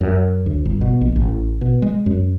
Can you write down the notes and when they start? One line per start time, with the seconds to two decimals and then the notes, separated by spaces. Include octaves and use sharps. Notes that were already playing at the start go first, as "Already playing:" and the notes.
0.01 F#2
0.46 D2
0.65 G1
0.81 B2
1.01 A#1
1.16 A1
1.61 B2
1.82 G#3
2.06 F#2